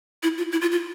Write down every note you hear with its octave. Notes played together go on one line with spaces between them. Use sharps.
E4
F4
E4
F4
F4